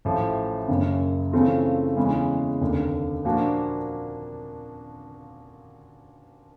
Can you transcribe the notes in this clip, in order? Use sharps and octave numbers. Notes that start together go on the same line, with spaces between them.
A1 A2 F3 A3
F#1 F#2 C#3
C#3 E3 A3 C4 F4
E2 C#3 E3 G#3
F1 D#2 D3
A#2 F3 A#3 D4 F#4